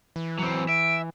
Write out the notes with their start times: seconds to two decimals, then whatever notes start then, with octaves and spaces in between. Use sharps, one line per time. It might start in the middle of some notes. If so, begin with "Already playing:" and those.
0.16 E3
0.39 F#3 C4
0.69 E5 D7